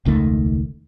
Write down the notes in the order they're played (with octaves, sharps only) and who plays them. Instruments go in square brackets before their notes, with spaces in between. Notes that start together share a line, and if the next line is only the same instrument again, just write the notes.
[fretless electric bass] E1 C#2 D#3 A3